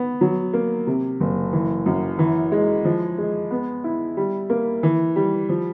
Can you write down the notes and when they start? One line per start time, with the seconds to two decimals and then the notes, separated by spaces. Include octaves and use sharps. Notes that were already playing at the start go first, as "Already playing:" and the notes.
Already playing: B3
0.21 F#3
0.53 A#3
0.87 C3
1.20 F#1
1.53 E3
1.86 F#2
2.19 E3
2.52 G#3
2.85 F3
3.18 G#3
3.51 B3
3.84 E4
4.17 G3
4.50 A#3
4.83 E3
5.16 G3
5.49 F3